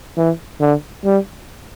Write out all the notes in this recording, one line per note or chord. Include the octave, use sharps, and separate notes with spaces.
E3
D3
G3